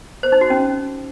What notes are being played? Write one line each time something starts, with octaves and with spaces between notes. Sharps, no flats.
C5
D#4
F#4
C#4